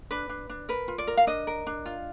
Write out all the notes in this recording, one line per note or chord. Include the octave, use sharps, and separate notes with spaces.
D4 B4
D4
D4
A#4 B4
F4
D5
A#4
F5
D4 D#5
A#4
D4
F4